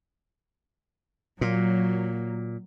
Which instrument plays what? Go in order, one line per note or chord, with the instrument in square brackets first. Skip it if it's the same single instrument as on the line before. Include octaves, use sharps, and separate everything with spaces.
[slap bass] A#2 [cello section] F#3 A#3